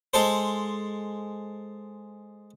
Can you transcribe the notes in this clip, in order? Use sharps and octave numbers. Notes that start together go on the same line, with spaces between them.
G#3 A4 C5